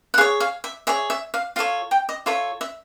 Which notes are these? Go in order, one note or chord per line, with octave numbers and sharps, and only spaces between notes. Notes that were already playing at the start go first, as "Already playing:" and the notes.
F#5
G#4 C#5 F5
F5
E5
G#4 C#5 E5
E5
F5
F4 A4 C#5 F5
G5
D#5
F4 A4 C#5 E5
E5